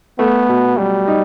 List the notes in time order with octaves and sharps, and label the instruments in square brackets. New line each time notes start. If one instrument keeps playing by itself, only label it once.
[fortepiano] A3 [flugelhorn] B3
[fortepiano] B2
[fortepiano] F#3 [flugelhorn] G3
[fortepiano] D#4